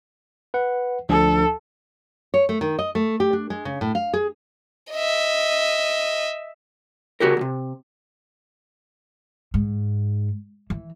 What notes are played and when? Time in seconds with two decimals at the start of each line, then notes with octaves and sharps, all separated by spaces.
0.54 B4 F#5
1.09 D2 F3 D4 A4
2.34 C#5
2.49 A3
2.61 D#3
2.79 D#5
2.95 A3
3.20 G4
3.33 D4
3.50 G#3
3.65 C#3
3.81 A2
3.95 F5
4.14 G#4
4.92 D#5 E5
7.20 C#3 F#4 G4 A#4
7.37 D2 C3
9.54 G#2
10.70 E3